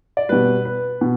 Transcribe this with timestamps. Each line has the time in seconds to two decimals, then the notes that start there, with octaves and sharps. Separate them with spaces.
0.17 D5
0.29 B2 G3 B4
0.65 B4
1.01 B2